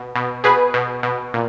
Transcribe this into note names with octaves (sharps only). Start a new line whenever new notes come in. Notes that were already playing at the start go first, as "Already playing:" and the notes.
Already playing: B2
B2
B2 G#4 B4
B2
B2
A#2